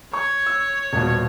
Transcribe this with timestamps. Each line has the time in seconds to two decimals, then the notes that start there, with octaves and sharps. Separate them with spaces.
0.13 C#5 C#6
0.46 E6
0.93 D#1 G2 B2